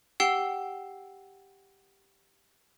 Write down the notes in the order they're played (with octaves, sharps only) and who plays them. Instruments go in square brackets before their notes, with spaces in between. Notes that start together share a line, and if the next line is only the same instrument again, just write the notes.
[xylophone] G4 F#5 G5 E6 C7 G7